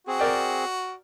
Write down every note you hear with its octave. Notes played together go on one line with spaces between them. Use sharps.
C4 F#4 G#4
A#4 D5 G5